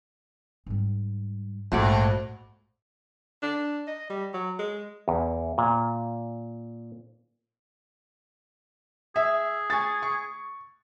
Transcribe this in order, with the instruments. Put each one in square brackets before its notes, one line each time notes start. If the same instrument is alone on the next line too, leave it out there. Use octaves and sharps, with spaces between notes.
[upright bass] G#2 G3
[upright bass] A#1 G#2 [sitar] F2 [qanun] A3 F#4 D5
[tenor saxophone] D4
D#5
G3
F#3
G#3
[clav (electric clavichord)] E2
A#2
[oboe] G#4 [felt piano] E5
[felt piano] G#5 C#6 A6
C#6